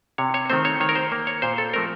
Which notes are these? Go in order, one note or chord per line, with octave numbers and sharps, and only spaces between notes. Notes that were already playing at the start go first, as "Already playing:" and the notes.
C3 C#5
C#5
D#3 A3 C4 C5
C#5
D#3 C#5
A#4
C5
A#3
C#5
A#2 C5
A4
F3 A3 C4 A#4